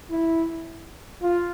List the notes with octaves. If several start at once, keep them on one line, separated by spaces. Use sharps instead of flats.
E4
F4